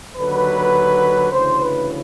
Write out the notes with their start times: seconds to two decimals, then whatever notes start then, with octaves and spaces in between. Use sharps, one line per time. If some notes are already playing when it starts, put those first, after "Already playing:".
0.18 D#2 D3 F#3 B4
1.31 D2 C#3 E3 C5
1.60 B4